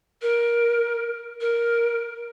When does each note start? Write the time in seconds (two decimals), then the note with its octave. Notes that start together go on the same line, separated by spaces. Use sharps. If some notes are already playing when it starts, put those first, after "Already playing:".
0.22 A#4
1.41 A#4